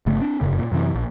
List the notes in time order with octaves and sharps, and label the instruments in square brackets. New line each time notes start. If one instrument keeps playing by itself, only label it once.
[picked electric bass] G1 C#3 A3
C4 D4
F1 F#2 C#3
A#2
F#2 C3 E3
A#1